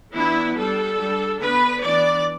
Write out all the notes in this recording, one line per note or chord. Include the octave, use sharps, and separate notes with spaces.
E3 B3 D4 E4
G3 D4 A4
G3 D4
D3 B3 D4 B4
E3 B3 D4 D5